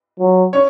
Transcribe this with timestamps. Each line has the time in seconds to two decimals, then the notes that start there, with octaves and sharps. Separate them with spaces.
0.19 F#3
0.53 C#4 C#5